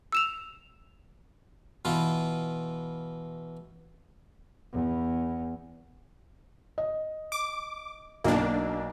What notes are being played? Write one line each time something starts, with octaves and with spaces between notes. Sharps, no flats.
E6 E7 F7
B2 E3 F4
E2
D#5
D6
B1 F#3 A#3 D4 D#4